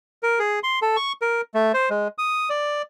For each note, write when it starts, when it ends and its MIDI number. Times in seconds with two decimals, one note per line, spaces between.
0.23 0.39 70
0.39 0.59 68
0.63 0.79 84
0.82 0.97 69
0.97 1.12 85
1.22 1.41 70
1.54 1.72 57
1.74 1.89 72
1.90 2.08 56
2.18 2.49 87
2.50 2.82 74